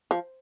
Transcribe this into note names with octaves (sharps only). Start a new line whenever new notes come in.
F3